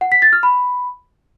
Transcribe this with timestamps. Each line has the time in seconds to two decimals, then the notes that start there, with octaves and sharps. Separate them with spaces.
0.01 F#5
0.12 B6
0.22 A6
0.33 F6
0.43 B5